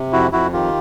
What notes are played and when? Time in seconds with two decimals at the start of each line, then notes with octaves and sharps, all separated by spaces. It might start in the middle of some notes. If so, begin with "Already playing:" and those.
Already playing: C3
0.12 F2 E4 F#4
0.32 F2 E4 F#4
0.53 D#3 F4 G4